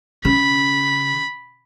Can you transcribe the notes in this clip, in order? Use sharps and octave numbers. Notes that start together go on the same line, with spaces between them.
C#3 B5